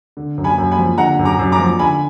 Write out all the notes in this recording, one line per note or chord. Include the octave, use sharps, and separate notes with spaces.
D3
F#2
G#5 B5
F#2
G#5 B5
F3
D3 F#5 A#5
F#2
A#5 D6
F#2
A#5 D6
F3
D3 G#5 B5